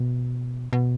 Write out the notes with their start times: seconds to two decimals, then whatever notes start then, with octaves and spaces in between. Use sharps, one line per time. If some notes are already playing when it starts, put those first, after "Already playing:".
Already playing: B2
0.73 B2